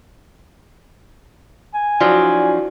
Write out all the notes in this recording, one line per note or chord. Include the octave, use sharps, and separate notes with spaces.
G#5
F3 F#3 D4 E4 F#4 D5